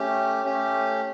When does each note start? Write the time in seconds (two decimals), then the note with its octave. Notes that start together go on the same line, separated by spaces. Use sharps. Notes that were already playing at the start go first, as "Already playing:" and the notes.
Already playing: A3 C#4 G4
0.44 A3 C#4 G4